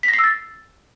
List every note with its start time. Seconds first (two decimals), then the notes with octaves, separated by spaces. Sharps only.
0.03 B6
0.08 A#6
0.13 C7
0.19 E6
0.24 A6